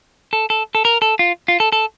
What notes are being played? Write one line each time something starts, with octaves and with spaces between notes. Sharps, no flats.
A4
A4
A4
A#4
A4
F4
F4
A4
A4